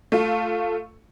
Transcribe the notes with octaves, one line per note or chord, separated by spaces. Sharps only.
A3 F4